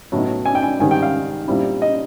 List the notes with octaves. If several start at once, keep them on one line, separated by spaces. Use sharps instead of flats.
A2 F#3 B3 D#4
G#5
G5
G#5
G#2 D#3 G3 G#5
G5
F5
A#2 G3 C4 E4
D#5